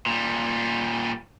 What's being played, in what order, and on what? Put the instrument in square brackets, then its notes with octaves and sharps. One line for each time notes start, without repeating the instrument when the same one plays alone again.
[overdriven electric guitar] A#2 G3